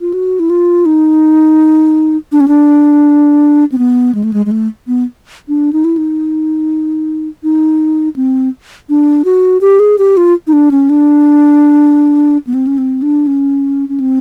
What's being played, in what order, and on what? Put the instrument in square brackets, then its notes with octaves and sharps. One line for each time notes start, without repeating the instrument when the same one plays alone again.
[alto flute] F4
F#4
E4
F4
D#4
D4
C#4
D4
C4
B3
G#3
A3
G#3
G#3
A3
B3
D4
D#4
E4
D#4
D#4
C4
D4
F#4
G4
G#4
G4
F4
D#4
D4
C#4
D4
B3
C4
C#4
C4
D4
C#4
C#4
C4